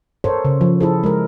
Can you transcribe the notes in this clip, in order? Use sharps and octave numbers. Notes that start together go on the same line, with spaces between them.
A4 A#4 C5 C#5
C#3
F3
E4 G#4 A4
G#3 A#4